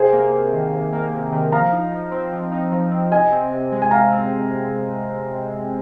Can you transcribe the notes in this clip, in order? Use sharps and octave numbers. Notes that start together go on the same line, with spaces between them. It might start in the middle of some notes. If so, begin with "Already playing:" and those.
Already playing: C3 G#4 C5
A#3
C3
D#3
C3
A#3
C3
D#3
F3 F5 A#5
D#4
F3
C4
F3
D#4
F3
C4
C3 D#5 G#5
C4
C3
G#3
G#5
C3 F5 A#5
C4